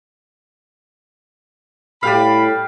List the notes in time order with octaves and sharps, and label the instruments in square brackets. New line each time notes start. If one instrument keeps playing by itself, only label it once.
[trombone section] A2 [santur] G3 G4 F5 [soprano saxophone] B5